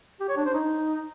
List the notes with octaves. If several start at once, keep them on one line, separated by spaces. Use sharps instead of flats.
G4
C#5
D4
C5
D#4